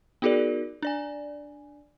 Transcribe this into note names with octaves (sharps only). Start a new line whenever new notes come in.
B3 D#4 F#4 G#4 A#4 D5
D4 D5 G#5